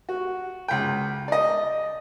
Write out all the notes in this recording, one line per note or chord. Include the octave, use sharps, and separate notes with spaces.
F#4
C#2 G5
D5 D#5